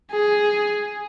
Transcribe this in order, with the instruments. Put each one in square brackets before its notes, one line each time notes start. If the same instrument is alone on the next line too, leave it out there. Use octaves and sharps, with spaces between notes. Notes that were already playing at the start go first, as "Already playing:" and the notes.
[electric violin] G#4